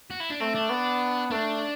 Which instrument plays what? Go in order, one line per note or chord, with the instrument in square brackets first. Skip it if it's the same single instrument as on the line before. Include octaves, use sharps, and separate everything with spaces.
[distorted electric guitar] F#4
E4
D4
[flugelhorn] A3 [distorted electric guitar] C4
[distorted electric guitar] D4
[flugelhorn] B3
[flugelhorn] A3 [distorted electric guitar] D4